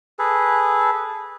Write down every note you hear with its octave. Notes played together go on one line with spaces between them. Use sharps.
G#4 A4 B4